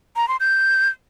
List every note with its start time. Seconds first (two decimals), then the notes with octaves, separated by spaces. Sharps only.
0.16 A#5
0.28 C6
0.40 G6